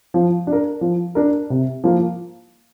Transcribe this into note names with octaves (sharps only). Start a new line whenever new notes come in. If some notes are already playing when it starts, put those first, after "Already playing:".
F3
D4
A#4
F3
D4 A#4
C3
F3 A#3 F4